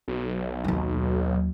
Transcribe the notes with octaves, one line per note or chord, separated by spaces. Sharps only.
B1
D#2 F#3